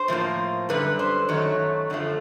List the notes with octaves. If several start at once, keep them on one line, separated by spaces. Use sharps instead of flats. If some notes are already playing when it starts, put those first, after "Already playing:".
Already playing: C5
A2 F3 A#3
F#2 D3 G3 B4
C5
F#2 D#3 F#3 A3 C#5
F#2 D3 F3 A3